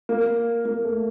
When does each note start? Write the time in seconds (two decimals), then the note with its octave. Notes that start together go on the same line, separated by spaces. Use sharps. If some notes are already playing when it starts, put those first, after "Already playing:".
0.09 A#3
0.65 A#3
0.85 A3